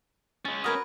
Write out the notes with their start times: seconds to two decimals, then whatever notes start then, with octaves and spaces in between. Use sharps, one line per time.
0.45 G#3 C#4 A6
0.64 F#4 A#4 B4 D#6 F6 G#6